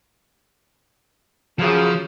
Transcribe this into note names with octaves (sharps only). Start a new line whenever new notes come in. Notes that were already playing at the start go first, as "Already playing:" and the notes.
F#2 C#3 F3